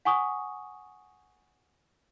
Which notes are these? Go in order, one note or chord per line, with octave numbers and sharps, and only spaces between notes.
F#5 G#5 C#6 D#6